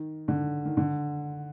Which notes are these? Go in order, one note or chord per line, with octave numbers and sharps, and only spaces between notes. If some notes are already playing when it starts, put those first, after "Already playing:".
Already playing: D#3
D3
D#3
D3